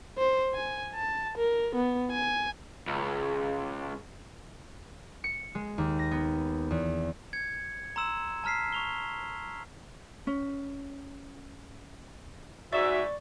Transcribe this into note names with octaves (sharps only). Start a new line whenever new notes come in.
C5
G#5
A5
A#4
B3
G#5
C#2
C#7
G#3
D#2
A#6
B3
E2
G#6 C#7
A#5 C6 E6 E7
A5 A#5 F6 B6 C7
C#6 F7 G7
C#4
G#2 F#4 D5 E5 C#6 A6